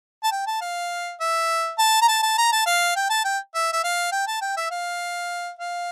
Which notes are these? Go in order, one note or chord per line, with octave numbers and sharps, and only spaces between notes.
A5
G5
A5
F5
E5
A5
A#5
A5
A5
A#5
A5
F5
G5
A5
G5
E5
E5
F5
G5
A5
G5
E5
F5
F5